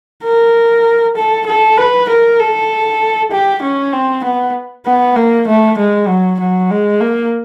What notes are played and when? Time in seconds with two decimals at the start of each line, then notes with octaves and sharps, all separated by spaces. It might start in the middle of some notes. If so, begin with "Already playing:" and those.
0.23 A#4
1.16 A4
1.46 A4
1.77 B4
2.09 A#4
2.39 A4
3.31 G4
3.62 C#4
3.93 C4
4.24 B3
4.86 B3
5.16 A#3
5.47 A3
5.78 G#3
6.08 F#3
6.40 F#3
6.71 G#3
7.00 A#3